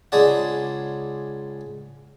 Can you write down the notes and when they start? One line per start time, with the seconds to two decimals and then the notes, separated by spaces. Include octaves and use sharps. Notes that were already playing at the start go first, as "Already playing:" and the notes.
0.12 C#2 G#3 D4 G#4 D5 F#5